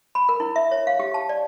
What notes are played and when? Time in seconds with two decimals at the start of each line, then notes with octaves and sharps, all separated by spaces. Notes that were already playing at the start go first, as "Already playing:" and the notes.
0.15 B5
0.29 A#4
0.40 E4
0.56 E5
0.71 C#5
0.87 F5
1.00 G4
1.14 A5
1.29 D5